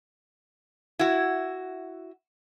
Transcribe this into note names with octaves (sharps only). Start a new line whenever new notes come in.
E4 F#4